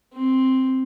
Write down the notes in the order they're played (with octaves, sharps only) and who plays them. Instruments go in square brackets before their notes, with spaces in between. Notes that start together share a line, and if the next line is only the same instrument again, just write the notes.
[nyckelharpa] C4